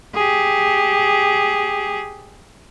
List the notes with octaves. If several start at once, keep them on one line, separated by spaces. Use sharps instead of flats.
G4 G#4